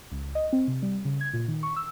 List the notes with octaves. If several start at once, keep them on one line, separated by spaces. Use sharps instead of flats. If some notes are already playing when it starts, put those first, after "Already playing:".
C#2
D#5
C4
C3
G3
C#3
G#6
A#2
D#3
C#6
E6